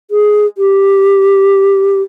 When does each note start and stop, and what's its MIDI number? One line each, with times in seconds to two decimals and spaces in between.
0.11 0.46 68
0.58 2.02 67